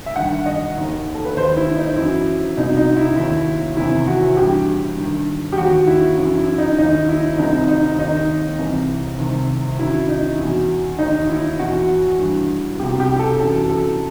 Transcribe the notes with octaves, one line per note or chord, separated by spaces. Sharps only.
E5
G2 D#3 F#5
D#5
D#2 D#3
A4
B4
D#2 D#3 C5
E4
D#4
F#2 E3 E4
C2 B2 D#4
D#4
E4
D#2 D#3 E4
E2 C3 D#3 E4
F#4
G2 E3 G4
G2 D#3
G4
D#2 D#3 F#4
E4
F#2 E3 E4
E4
D#4
D#2 D#3 D#4
E4
C2 C3 D#3 D#4
D#4
D#2 D#3 D#4
C2 C3 E3
C2 C3 D#3
F#2 D#3 E4
D#4
E2 B2
D#2 D#3 D#4
E4
E2 B2 F#4
G2 E3
C2 B2 G4
G4
A4
F#2 E3 A4
A4